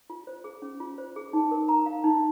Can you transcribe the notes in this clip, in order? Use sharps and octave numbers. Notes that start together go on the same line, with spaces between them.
F4
C5
G#4
C#4
F4
C5
G#4
D#4
A#4
A#5
F5
D#4